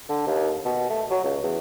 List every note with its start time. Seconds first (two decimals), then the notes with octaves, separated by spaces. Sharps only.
0.09 D3
0.26 D#2
0.65 B2
0.90 A3
1.10 F#3
1.24 C#2
1.43 E2